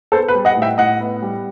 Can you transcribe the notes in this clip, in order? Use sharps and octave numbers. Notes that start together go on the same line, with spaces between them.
B3 A4 C5
B4
G3
D#5 F#5
A2
E5 G5
A2 D#5 F#5
B3
G3